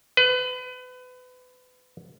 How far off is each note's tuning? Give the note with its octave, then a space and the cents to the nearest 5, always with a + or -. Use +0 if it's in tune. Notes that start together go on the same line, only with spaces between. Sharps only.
B4 +30